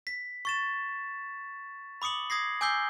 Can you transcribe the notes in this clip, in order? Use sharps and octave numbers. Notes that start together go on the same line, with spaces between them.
B6
C#6 A6 E7
B5 D6 D#6 C#7 F#7
D#6 G#6 A#6 C7
G#5 D6 E6 G6 C7 G7